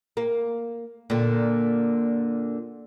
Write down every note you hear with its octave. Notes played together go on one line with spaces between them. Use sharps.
A#3
A#2 D3